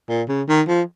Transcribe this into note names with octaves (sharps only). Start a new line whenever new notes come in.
A#2
C#3
D#3
F3